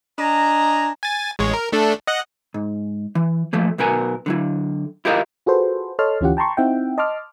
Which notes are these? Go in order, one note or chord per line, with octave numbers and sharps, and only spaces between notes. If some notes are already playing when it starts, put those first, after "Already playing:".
D4 D#5 G#5 A#5
G#5 A6
A1 G#3 C#5
A#4
A3 D4 A4
D#5 F#5 F#6
G#2
E3
F3 A3 A#3
B1 B2 B3 A#4 G#5
D3 F#3 E4
E4 F4 G4 A#4 D#5 F5
F4 F#4 G#4 A4 B4 C5
A4 C#5 D#5 A5 C6 F6
D2 E3 C#4 F4 G4 F#5
G5 A5 A#5 C6 C#6
C4 D#4 E4 E5 F#5 G5
D#5 A5 C6 D6 F6